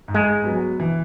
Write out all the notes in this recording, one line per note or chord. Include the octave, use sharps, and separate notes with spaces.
G#2
G#3
F#3 B3
E3